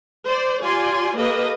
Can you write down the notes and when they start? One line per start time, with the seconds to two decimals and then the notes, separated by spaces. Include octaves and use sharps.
0.26 C5 D5
0.61 F4 G4 D5 G#5 C6
1.17 A#3 G4 A4 B4 D#5